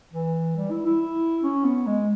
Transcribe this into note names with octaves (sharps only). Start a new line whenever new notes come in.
E3
G3
E4
E4
C#4
B3
G#3